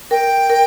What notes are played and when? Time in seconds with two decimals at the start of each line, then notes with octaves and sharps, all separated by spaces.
0.11 A#4 G5
0.50 A#4